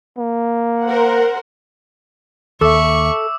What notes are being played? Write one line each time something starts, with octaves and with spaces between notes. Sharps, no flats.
A#3
A#4 C5 F#5
D#2 A4 E5 C#6 D6 E6